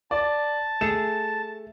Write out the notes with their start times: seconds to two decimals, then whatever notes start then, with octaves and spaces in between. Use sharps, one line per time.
0.11 D5 A5
0.81 A3 G#4 E7